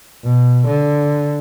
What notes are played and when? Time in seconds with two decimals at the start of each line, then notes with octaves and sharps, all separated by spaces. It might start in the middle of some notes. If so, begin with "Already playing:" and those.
0.25 B2
0.67 D3